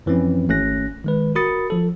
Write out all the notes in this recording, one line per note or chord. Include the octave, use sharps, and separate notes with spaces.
F#2 E3 F3 C4 C#4
G#1 A3 C#4 F#6 A#6
D#3 G#3 B4
F#4 A#4 B5 D#6 A6 C#7
F3 A4